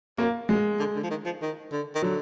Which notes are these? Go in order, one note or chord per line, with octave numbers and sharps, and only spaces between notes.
F#2 A#3
F#2 G#3
D3
D3
F3
D#3
F3
D#3
D3
D#3
D3 F#3